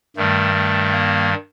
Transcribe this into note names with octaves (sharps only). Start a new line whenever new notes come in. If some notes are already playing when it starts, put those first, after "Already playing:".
G2 D#3 G3 A3
A3
A#3